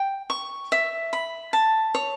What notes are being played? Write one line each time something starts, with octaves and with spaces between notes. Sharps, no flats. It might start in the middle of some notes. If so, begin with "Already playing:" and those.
Already playing: G5
C#6
E5
B5
A5
C#5